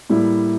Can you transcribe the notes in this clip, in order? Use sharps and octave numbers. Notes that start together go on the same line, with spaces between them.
A2 G3 A#3 E4